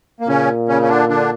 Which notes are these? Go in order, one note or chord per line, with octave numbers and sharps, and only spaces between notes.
A#3
A#2 C#3 C#4
C#3 C#4
C#4
D3 D4
D3 D4